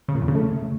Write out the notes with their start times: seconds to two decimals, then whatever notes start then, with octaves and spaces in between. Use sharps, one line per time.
0.08 C#3
0.15 A#2
0.22 E2
0.28 C#3
0.35 A3